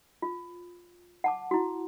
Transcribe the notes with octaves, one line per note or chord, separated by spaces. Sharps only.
F4
F#5 A5 D6
E4 F#4